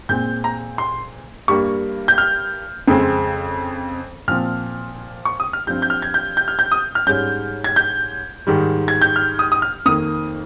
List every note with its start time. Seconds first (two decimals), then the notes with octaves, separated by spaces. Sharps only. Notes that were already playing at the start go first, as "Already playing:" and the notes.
0.09 A#2 G#3 C4 G6
0.44 A#5
0.78 C6
1.48 G2 G3 A#3 C#6
2.08 G6
2.18 F6
2.88 F2 C#3 G#3 C4
4.28 A#2 F3 C4 F6
5.25 C#6
5.40 D#6
5.53 F6
5.67 G2 F3 C4 G6
5.82 G6
5.90 F6
6.02 G#6
6.14 G6
6.37 G6
6.48 F6
6.59 G6
6.72 D#6
6.95 F6
7.07 G#2 G3 C#4 G6
7.64 G#6
7.76 G6
8.47 G#2 D#3 G3
8.88 G#6
9.02 G6
9.16 F6
9.39 D#6
9.52 D#6
9.62 F6
9.86 F2 D#3 A#3 D#6